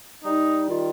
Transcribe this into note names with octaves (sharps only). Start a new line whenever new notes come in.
G3 D#4
D#3 F4